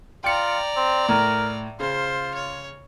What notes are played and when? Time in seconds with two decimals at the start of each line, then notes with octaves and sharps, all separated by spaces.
0.24 F4 D5 G5 A#5 C#7
0.76 C4
1.09 A2 A#4
1.80 C#3 F4 C5
2.34 C#5